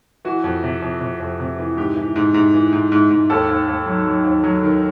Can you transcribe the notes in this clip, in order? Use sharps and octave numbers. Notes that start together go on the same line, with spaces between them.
E3 F#4
F2
C3
F2
C3
F2
C3
E3
G#2 G4
E3
G#2
G#2
E3
G#2
G#2
G#2
D#2 A4
D#2
D#2
F#3
F#3
D#2
F#3
D#3